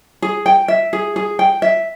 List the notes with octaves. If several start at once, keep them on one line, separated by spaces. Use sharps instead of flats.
G#4
G5
E5
G#4
G#4
G5
E5